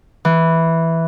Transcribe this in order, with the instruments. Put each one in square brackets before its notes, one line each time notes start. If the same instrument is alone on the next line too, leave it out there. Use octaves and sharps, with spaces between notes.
[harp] E3